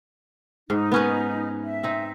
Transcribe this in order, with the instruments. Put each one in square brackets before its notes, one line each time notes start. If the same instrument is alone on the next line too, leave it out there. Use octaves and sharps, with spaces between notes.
[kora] G#2 [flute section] D#4
[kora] B3 C#4 B4
[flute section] E5
[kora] C4 D#4